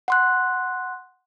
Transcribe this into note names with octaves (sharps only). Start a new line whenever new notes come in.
F#5 C6 F#6